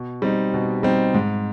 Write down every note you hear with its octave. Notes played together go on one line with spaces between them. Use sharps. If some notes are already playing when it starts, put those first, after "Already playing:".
Already playing: B2
G3 C4 D#4
B2
G3 C4 D#4
G#2